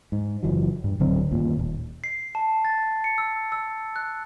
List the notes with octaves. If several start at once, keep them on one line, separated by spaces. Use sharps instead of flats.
G#2
F#1 E3 F#3
G2
D1 D3 F#3 C4
G1 D#2 A#2
D#1
C7
A5
A6
C#7
E6
E6
F#6